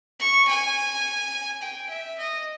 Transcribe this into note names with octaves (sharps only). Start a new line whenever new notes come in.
C#6
G#5
G5
E5
D#5